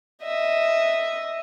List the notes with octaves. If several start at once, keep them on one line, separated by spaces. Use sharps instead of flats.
D#5 E5